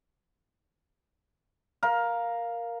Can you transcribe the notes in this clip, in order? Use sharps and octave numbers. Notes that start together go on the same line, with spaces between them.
A#4 F5